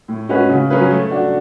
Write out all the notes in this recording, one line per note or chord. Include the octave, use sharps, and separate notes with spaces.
A2
G#3 C#4 F#4 B4
C#3
F#3 C#4 G#4 B4
A3
D4 F#4